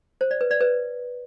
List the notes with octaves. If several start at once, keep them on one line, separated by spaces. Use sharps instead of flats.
C5
D5
B4
D5
B4